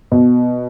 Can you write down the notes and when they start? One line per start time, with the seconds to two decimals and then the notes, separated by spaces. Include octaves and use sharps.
0.12 B2